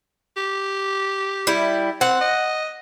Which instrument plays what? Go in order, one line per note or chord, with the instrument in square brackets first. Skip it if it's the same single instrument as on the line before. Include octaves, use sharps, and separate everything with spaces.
[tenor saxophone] G4
[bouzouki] G3 E4
[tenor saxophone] C4 [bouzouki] F#5
[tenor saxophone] D#5